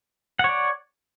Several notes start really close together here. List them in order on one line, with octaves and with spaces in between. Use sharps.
F#5 C#5 D5